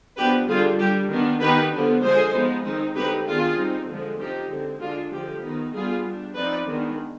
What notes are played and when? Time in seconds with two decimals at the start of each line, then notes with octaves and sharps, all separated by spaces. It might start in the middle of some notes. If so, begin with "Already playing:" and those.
0.17 F3 B3 D4 G4 B4
0.48 D3 G3 D4 F4 G#4
0.79 G3 D4 G4
1.11 D#3 B3 D4
1.41 D#3 B3 D#4 G4 B4
1.73 D3 F3 B3 D4
2.03 D3 F3 G#3 G#4 C5
2.34 F3 G#3 B3 D#4
2.64 D#3 G#3 C4 D#4
2.95 D3 G#3 C4 D#4 G4 B4
3.27 D#3 B3 D4 F4 G#4
3.58 G3 C4 D#4
3.89 D3 F3 G#3
4.19 F3 C4 D#4 G4
4.50 D3 G#3 C4
4.81 D3 G#3 D4 F4
5.12 D3 F3 G#3 G4
5.44 D#3 B3 D#4
5.74 G3 B3 D4 F4 G#4
6.05 G3 D4
6.36 F3 C4 D#4 B4 D5
6.67 D#3 G#3 B3 D4